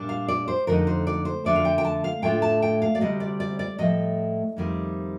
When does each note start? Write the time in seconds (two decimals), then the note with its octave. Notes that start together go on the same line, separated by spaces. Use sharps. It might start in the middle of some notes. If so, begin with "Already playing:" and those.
Already playing: A#2 G3 D4
0.09 F5
0.28 D5
0.48 C5
0.67 F2 D3 A3 D#4 A#4
0.87 C5
1.07 D5
1.25 C5
1.45 F2 D3 A3 D4 D5
1.56 F5
1.65 G5
1.78 G5
1.84 A5
2.04 F5
2.22 A2 A3 D4 F4 G5
2.42 A5
2.62 G5
2.82 F5
2.95 D5
3.00 D2 C3 G3 C4 D#5
3.20 D5
3.40 D5
3.59 D5
3.78 A2 F3 A3 D#5
4.57 F2 D#3 G3 C4